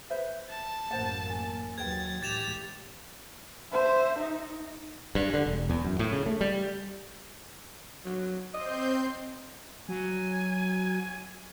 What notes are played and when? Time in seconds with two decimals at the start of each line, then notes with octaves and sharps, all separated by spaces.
0.10 B4 C5 E5
0.50 A5
0.91 A1 F#2 A#3 C5 F#5
1.30 G#5
1.78 D#2 F#3 B4 G5 G#6 A6
2.23 C#2 A2 E3 G4 A6 E7 F7
3.73 C5 E5
4.19 D#4
5.15 G2
5.34 D3
5.46 E1
5.70 E2
5.85 F#2
5.99 A2
6.12 C#3
6.26 A3
6.41 G3
8.05 F#3
8.54 C4 D#5 C6 G6
9.89 F#3 G#5